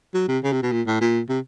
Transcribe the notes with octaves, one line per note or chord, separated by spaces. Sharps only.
F#3
C3
C#3
C3
B2
A#2
A2
A#2
C3